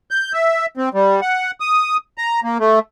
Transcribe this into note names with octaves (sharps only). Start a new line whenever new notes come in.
G6
E5
C4
G3
F#5
D#6
A#5
A#3
A3